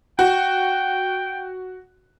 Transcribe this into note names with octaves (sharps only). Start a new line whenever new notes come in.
F#4 G5